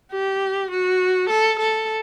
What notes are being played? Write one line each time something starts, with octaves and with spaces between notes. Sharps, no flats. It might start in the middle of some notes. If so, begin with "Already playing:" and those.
G4
F#4
A4
A4